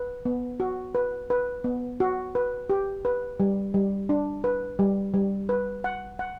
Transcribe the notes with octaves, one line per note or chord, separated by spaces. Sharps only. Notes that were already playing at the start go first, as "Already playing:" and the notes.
Already playing: B4
B3
F#4
B4
B4
B3
F#4
B4
G4
B4
G3
G3
D4
B4
G3
G3
B4
F#5
F#5